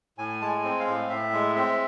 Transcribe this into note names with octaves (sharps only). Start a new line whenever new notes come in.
A2 G#5
G#3 A5
G#5
C4
F5
A2
A2 E5
G#3
C4 E5